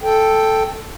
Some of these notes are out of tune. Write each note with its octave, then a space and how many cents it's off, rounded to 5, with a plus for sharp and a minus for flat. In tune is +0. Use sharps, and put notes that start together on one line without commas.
A4 +0 G5 +5